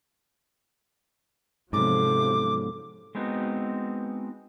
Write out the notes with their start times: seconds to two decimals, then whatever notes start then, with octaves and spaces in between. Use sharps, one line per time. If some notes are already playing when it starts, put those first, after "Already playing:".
1.73 G#2 C3 F3 F#3 B3 C#4 A4 D6
3.15 G#3 B3 C4 D#4 F#4